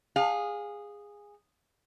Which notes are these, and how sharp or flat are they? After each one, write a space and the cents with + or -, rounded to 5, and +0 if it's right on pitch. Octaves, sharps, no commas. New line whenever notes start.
G#4 -15 F5 +20